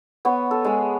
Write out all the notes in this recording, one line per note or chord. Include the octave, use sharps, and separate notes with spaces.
B3 C#5
A4
G#3 G#4